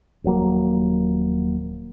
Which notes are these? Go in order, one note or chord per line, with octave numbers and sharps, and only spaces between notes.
D#1 F3 F#3 A#3